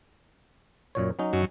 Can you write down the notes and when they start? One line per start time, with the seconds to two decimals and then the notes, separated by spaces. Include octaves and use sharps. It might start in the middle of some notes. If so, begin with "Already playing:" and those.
0.95 F#2 A#2 C#5
1.19 F#3 C#4 D#4
1.33 F#2